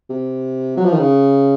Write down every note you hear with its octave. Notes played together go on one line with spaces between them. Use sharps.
C3
F#3
F3
D#3
C#3